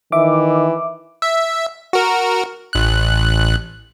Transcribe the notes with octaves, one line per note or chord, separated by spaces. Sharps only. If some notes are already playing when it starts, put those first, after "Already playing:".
D#3 E3 E5 D6
E5
F#4 A#4
A1 F#6